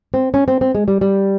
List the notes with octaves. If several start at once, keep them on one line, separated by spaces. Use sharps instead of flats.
C4
C#4
C4
C4
G#3
G3
G3